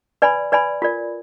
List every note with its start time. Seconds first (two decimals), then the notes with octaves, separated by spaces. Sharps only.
0.22 B4 D5 G#5 B5
0.52 B4 D5 G#5 B5
0.82 F4 A#4 D5